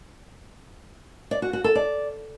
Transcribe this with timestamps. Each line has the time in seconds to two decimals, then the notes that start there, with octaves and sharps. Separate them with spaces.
1.31 D5
1.42 F#4
1.53 F#4
1.64 A4
1.75 D5